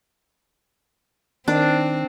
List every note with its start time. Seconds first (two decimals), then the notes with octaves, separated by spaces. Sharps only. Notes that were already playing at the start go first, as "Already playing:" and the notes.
1.48 D#3 C4 D4